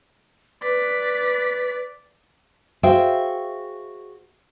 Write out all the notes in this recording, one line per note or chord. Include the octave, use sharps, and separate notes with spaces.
B4 D5 B6
F#4 G#4 C5 E5 F5 G5